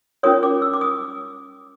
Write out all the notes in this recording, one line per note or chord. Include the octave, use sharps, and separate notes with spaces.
C#4 F4 A#4 C#5 D#6
D6
E6
D6
D#6